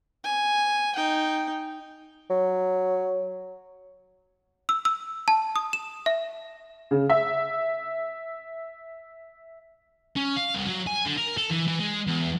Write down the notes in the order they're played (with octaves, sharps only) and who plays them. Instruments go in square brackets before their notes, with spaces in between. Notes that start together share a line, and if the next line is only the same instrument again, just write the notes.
[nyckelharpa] G#5
D#4 G5
[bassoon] F#3
[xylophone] E6
E6
A5
D#6
E7
E5
[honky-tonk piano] C#3
E5
[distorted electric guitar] C#4
F5
C2
F#3
G#5
D3
A#4
A4
E3
E3
G#3
E2